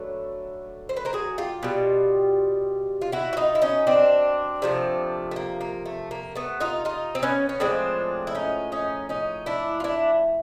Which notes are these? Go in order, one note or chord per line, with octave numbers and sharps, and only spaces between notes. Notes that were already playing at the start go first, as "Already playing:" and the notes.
Already playing: D3 F#3 A3 B4 C#5
C5
B4
A#4 C5
F#4 G#4
F4 G4
B2 G3
F4
E4 F#4
F#4
D#4 F4
E4
C#4 D#4
C4 D4
C3 F3 A3
A3
A#3
A#3
A3
A#3
A3 B3
D#4 F4
D#4 F4
C4
B3 C#4
C#4
A2 F3 G#3 C4 D4
E4
C#4 D#4
C#4 D#4
C#4 D#4
D4 E4
F4
D4 E4